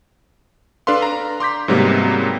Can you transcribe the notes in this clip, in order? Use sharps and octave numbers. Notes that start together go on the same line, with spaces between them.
D4 A4 B4 F5 C6
A#5
C6 D6 G6 B6
G#2 C3 F#3 G3 A#3 B3